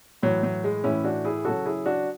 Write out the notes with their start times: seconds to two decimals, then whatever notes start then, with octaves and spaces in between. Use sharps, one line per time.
0.23 A2 E3 F#3
0.43 F#3
0.64 G#3
0.84 A2 E3 C#4 E4
1.04 D4 F#4
1.25 E4 G#4
1.45 C#3 F#3 F#4 A4
1.66 E4 G#4
1.86 D4 F#4